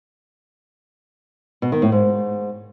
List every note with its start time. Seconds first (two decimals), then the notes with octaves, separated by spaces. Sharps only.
1.62 B2
1.72 D#3
1.82 A2
1.92 G#2